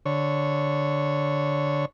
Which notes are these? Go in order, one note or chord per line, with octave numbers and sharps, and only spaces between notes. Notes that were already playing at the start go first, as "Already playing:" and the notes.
D3 C#5